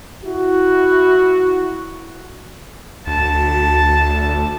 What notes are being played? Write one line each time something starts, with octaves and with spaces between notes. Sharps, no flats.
E4 F#4
D2 A5